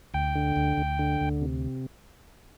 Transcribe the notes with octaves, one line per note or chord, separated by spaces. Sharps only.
D2 G5
D3
D2
D2
D3
D2
C3